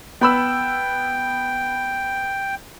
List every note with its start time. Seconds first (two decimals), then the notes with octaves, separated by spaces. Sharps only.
0.21 B3 G5 B5 E6